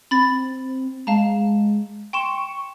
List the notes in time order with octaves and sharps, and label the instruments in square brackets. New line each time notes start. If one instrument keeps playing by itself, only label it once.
[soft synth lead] C4 [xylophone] B5 A6
[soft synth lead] G#3 [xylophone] F5 A5 A#5
[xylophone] G5 C6 E7 [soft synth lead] C#6